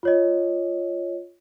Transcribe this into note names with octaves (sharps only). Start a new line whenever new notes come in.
F4 C#5 D#5